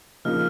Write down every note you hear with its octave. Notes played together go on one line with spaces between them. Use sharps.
C#3 F3 A#3 D#4 F6